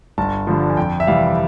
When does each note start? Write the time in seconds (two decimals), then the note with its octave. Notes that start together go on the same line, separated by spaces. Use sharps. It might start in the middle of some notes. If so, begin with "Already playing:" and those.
0.18 G1 A5
0.47 G2 D3 F3
0.70 G#5
0.77 F2 G5
1.00 E5
1.07 C3 E3 G3 F5